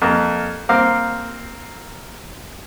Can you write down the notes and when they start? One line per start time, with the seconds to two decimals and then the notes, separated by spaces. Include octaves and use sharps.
0.02 F2 A#3
0.69 A#3 C4 F5 D6